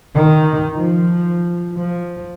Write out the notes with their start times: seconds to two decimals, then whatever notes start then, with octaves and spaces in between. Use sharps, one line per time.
0.13 D#3
0.74 F3
1.76 F3